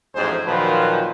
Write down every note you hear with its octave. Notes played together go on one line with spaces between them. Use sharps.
A1 F2 G#2 G#4 C5
A#2 D#3 F3 F#3 B4